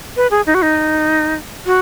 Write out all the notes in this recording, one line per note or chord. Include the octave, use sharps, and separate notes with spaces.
B4
G#4
D#4
F#4
D#4
F#4